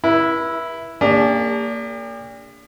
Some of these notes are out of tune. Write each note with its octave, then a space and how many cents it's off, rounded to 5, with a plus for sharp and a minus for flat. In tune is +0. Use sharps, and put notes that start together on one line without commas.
E4 +0 B4 -40
A#3 -20 D4 -30 G4 +45